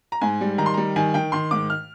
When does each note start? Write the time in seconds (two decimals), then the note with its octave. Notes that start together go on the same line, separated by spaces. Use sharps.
0.12 A#5
0.22 G#2 G#5
0.41 G3
0.58 D#3 A#5
0.66 C6
0.74 G3 A#5
0.96 D#3 G#5
1.14 D#3 G5
1.32 D#3 C6
1.51 G#2 D6
1.70 F6